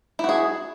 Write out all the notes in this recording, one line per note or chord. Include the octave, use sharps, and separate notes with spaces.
E4 F#4 G#4